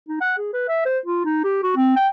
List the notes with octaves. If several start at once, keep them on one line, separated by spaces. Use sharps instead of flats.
D#4
F#5
G#4
B4
E5
C5
F4
D#4
G4
F#4
C4
G5